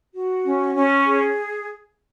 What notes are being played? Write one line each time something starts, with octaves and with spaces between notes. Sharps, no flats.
F#4
C#4
C#4
G#4